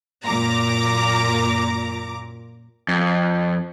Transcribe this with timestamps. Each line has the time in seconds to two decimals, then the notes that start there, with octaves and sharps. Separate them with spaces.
0.25 F#2 A#2 A#5 D6
2.88 F2